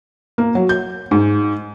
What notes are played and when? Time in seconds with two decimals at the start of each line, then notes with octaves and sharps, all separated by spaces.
0.38 A#3
0.55 F#3
0.69 G6
1.11 G#2